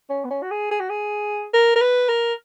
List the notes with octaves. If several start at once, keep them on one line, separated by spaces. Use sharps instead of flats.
C#4
B3
C#4
F#4
G#4
G#4
F#4
G#4
A#4
A#4
B4
A#4